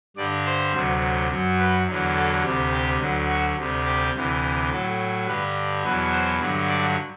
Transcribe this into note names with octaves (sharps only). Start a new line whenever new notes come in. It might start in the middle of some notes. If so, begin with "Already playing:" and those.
G2 D3 G3 D5
C5
D2 C3 F#3
F#2 F#3
B4
E2 D3 F#3
A4
D2 C3 G3
G4
D2 D3 F#3
F#4
D2 C3 G3
G4
D2 C3 E3
A2 F#3 A4
G2 D3 G3 B4
E2 B2 F#3 B4
C5
G2 D3 F#3
D5